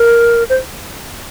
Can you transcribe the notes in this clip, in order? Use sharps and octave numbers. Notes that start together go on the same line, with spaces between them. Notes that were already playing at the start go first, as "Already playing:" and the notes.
Already playing: A#4
C5